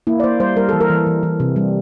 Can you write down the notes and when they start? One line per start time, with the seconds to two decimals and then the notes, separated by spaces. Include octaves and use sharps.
0.07 A#3 E4
0.20 D5
0.24 A#3 C5
0.40 G3 C5
0.56 G3 A#4
0.69 E3 A4
0.81 A#4
0.90 E3
1.07 E3
1.23 E3
1.40 C3
1.56 G3